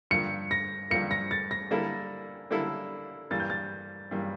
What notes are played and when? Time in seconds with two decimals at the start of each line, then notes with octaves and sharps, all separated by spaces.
0.11 G2 D3 F3 A#3 C#7
0.51 A#6
0.90 G2 D3 F3 A#3 C#7
1.11 A#6
1.31 A6
1.51 A#6
1.71 D3 G3 A#3 E4 A4
2.50 D3 G3 A#3 E4 A4
3.30 G2 E3 G3 A#3 A6
3.40 G6
3.50 A6
4.11 G2 E3 G3 A#3